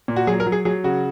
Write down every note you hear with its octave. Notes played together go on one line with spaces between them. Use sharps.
A#2
F#4
F#3 G#4
A#4
F#3
G#4
F#3 G#4
C#3 F#4